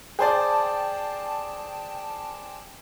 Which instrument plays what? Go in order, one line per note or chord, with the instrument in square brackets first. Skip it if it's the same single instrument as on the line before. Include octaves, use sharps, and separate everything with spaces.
[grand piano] G#4 C5 D5 [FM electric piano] G5 A5